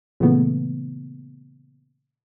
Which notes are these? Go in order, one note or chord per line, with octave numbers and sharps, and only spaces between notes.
A#2 C#3 E3 A3 B3 E4